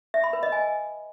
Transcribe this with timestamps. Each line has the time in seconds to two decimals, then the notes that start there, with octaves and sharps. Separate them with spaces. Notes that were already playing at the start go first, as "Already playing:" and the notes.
0.14 E5
0.24 B5
0.33 B4
0.43 D#5
0.52 G#5